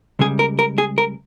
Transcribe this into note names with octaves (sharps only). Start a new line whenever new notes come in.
C#2 C#3 G3 G#4
A#4
A#4
G#4
A#4